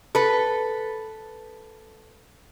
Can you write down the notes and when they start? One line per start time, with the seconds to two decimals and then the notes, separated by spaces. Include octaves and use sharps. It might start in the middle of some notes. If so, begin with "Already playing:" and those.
0.15 A4 B4